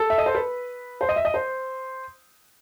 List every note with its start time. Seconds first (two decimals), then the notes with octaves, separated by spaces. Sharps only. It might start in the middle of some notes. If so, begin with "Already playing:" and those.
Already playing: A4
0.10 E5
0.18 D#5
0.26 C5
0.35 B4
1.01 C5
1.09 D#5
1.16 E5
1.25 D#5
1.34 C5